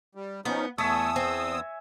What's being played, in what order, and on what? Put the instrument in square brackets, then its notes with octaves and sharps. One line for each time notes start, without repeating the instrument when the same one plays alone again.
[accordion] G3
[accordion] F3 C#4 D#4 [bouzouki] B3
[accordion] E2 D#6 E6 [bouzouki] A3 [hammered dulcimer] C#5 E5 G#5
[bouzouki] C4